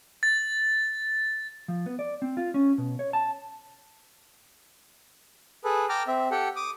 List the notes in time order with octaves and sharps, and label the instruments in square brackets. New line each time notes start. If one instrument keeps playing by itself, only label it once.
[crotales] A6
[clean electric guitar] F3
B3
D5
C4
F4
C#4
B2
C#5
A5
[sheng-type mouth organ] G#4 A4 B4
G5 A5 A#5 D6 F6
C4 E5
G4 A4 F#5 G5
D6 D#6